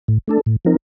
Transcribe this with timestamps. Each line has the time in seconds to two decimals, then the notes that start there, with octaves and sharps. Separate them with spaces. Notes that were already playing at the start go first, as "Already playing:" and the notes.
0.08 A2
0.28 A3 D4 A4
0.46 A2
0.65 F3 C4 D#4 A#4